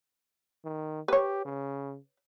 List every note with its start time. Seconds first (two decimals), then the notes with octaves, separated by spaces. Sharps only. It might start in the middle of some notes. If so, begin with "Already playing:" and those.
0.65 D#3
1.08 G4 B4 C#5
1.45 C#3